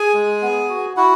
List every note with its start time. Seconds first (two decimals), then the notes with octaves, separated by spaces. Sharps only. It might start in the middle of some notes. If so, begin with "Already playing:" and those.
Already playing: G#4 G#5
0.14 G#3
0.42 B3
0.69 F#4
0.97 E4 F#4 F#5